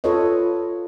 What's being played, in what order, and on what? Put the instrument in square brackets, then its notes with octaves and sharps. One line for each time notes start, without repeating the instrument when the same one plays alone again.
[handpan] F4 A4 B4 C#5 D#5